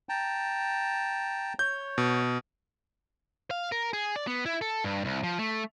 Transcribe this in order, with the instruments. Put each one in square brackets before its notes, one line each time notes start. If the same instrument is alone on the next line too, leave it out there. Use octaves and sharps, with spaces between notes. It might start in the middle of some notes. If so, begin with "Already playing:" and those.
[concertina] G5 A5 A#5
[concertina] C#5 [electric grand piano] G6
[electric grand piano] B2
[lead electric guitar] F5
A#4
G#4
D5
B3
E4
A4
G2
C2
F3
A3